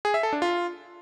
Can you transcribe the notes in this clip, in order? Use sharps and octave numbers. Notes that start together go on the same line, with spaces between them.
G#4
E5
A4
D4
F4